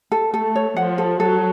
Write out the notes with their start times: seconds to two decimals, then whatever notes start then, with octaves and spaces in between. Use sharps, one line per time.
0.12 A4
0.33 A3 A4
0.55 C#5
0.76 F3 F#5
0.98 A4
1.20 F#3 A4